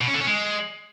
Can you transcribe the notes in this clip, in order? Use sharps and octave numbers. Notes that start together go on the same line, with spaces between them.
B2
C#4
D3
C#4
G#3